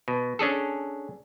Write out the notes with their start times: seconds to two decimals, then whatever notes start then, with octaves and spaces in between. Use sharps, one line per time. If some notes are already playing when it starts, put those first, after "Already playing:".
0.08 B2
0.39 C#4 D4 G#4 A4